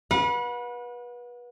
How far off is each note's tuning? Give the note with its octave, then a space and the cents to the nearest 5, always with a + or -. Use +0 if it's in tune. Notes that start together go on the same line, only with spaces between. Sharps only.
B4 -25 F#5 -35